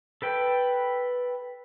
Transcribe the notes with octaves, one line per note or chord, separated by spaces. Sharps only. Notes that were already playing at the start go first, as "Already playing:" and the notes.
A4 B4 G5